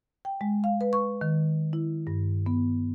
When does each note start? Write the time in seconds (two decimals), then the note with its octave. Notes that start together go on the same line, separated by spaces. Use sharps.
0.25 G5
0.41 G#3
0.64 F5
0.81 B4
0.93 C#6
1.21 D#3
1.73 E4
2.07 G2
2.46 B3